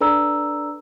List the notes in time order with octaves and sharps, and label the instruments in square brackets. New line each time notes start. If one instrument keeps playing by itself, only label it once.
[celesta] D4 A4 B4 D5 A#5 E6